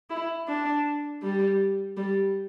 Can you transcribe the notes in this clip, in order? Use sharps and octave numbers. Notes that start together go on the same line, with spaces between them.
E4
D4
G3
G3